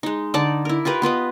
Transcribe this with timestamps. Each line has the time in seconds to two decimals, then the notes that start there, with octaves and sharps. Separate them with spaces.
0.03 G#3 D#4
0.34 D3 D#4 D5 A5
0.65 E4 A#4
0.85 F4 G4 A#4 B4
1.02 B3 F4 B4 D#5